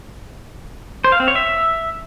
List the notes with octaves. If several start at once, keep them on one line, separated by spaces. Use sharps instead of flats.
C5
F5
C4
C#5
E5